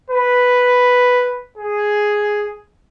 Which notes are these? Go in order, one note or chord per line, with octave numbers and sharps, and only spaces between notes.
B4
G#4